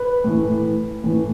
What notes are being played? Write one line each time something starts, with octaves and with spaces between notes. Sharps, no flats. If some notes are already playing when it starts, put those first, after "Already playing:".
Already playing: B4
A2 E3
A2 E3